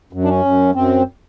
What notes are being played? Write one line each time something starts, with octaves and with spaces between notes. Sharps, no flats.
F#2
D4
C#4
F#2
F#2 C4